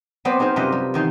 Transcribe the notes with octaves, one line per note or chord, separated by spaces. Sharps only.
F#3 B3 C4 C5 D5
B3 D#4 G#4 A#4 C5
F#2 C3 G3 F4 D#5 F#5
G3
E2 D#3 D#4 C6